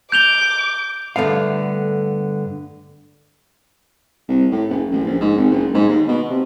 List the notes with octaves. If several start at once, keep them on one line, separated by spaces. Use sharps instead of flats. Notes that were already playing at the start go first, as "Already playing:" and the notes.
D6 G6 F7 G7
G2 D3 A3 B3 F5
C2
A2
F#1
A1
A#1
G#2
G#1
F#1
G#2
D#2
B2
C3